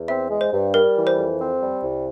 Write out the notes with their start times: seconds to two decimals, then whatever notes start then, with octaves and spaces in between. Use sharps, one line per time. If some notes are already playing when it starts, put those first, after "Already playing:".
Already playing: E2
0.08 C4 E5
0.30 G#3
0.41 C5
0.52 G2
0.74 G3 A#4
0.95 E3
1.07 C5
1.17 F2
1.39 C4
1.60 G3
1.83 C2